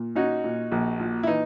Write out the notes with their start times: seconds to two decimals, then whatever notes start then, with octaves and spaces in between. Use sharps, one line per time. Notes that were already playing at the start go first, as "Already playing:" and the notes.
Already playing: A#2
0.15 C#4 D#4 F#4
0.44 A#2
0.72 A#1
1.00 A#2
1.23 E4
1.27 E3 D#4